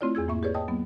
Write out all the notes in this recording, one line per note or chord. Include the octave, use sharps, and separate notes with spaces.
A3 C4 E4 F4 C#5 D5
E2 G#4 E6 G#6
G#2 A#3 E5 C#6
G4 G#4 B4 C#5 D5
C#5 D#5 G5 A5 D#6
F#3 A#3 B3